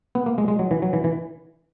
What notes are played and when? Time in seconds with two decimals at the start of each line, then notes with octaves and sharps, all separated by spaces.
0.15 B3
0.26 A#3
0.38 G#3
0.48 G#3
0.59 F#3
0.71 E3
0.82 F#3
0.93 E3
1.04 E3